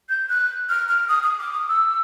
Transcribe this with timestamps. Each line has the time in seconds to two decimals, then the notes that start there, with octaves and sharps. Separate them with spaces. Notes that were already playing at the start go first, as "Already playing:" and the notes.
0.09 G6
0.29 F#6
0.69 F6
0.88 F6
1.08 D#6
1.23 D#6
1.38 D6
1.53 D#6
1.68 E6